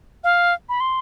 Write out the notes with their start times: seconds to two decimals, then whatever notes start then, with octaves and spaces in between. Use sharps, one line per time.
0.24 F5
0.69 B5
0.80 C6